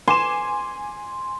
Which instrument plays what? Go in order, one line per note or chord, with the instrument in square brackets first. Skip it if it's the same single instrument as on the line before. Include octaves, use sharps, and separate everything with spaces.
[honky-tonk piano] G#5 D6 E7 [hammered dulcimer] C6